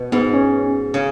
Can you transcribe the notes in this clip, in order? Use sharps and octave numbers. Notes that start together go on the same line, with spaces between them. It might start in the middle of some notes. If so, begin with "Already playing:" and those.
Already playing: B2
G#2 B3
C#4
C#3